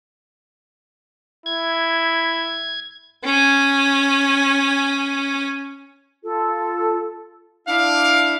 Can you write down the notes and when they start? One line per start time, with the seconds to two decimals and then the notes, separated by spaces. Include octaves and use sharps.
1.46 E4 G#6
3.24 C#4 G#5
6.23 F4 A4
7.68 D4 E4 F5